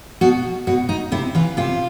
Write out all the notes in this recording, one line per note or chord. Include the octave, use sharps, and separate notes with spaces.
B2 F#4
B2 F#4
D#4
C3 E4
E3 F4
C3 F4